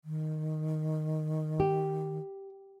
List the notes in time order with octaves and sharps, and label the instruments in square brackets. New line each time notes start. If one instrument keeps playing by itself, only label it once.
[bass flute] D#3
[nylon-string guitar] G4